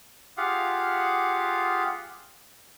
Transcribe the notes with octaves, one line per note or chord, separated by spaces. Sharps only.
F4 G4 G#4 F5 F#5